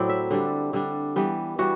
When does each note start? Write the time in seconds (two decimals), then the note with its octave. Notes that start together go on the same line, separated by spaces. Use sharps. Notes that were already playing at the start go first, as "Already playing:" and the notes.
Already playing: A2 F#3 C4 E4 D5
0.09 E5
0.31 D3 G3 D4
0.73 D3 G3 D4
1.16 E3 G3 B3
1.59 E3 G3 F#4